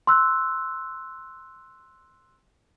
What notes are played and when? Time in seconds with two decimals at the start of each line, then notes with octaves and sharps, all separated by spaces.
0.07 C6 E6 F#6